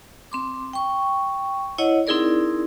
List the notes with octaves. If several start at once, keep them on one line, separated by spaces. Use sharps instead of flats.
C4 C6 D6
G5 C#6
E4 C#5 D#5 F#5
C4 D#4 E4 G#4 A#4 D5